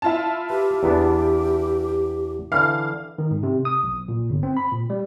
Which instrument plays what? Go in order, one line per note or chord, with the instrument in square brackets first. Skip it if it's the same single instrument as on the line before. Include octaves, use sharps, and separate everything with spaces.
[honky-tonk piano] E4 F4 A5
[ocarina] G4 [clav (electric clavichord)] B4
[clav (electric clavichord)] E2 B3 D4
[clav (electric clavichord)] D3 E3 [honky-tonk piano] F5 F6
[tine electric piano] D#3
G#2
C3
D#6
B1
A#2
G1
C4
B5
A#2
G3